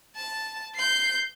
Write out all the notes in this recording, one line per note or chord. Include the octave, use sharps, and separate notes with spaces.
A5
G6 C7